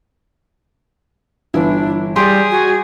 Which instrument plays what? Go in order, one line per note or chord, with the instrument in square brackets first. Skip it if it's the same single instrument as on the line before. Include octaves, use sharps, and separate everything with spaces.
[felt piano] G1 E3 E4 [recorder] D4
[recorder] G3 [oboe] G4 [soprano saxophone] G#4 [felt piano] C6
[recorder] F#4 [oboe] G#5